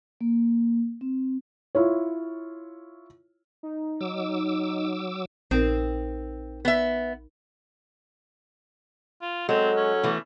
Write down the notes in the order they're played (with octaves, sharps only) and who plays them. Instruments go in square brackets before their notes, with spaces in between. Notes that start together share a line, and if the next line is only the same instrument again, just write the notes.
[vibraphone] A#3
C4
[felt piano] E4 F4 C#5
[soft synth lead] D#4
[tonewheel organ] F#3 D6 E6
[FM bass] A#1 [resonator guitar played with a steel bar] C4 [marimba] D#4 A#4
[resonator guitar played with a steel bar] B3 E5
[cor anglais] F4
[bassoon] F#3 [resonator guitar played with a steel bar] G#3 [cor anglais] C4 [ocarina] A4
[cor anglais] C#4
[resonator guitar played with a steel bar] E3 A3